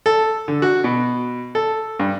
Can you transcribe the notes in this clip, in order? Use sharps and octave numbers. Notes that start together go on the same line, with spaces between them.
A4
D3
F#4
B2
A4
G2